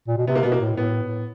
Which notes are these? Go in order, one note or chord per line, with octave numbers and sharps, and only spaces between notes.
A#2
B2
C3 B3
A#3
B2 B3
A#3
A2
A2 B3
A2